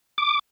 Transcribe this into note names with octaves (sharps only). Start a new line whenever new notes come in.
D6